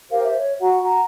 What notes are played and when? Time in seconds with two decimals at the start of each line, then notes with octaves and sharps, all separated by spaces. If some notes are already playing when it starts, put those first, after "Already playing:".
0.11 G4 A#4 C5 F5
0.23 C5 E5
0.38 C#5
0.60 F#4 F#5 A#5
0.83 F#5 A#5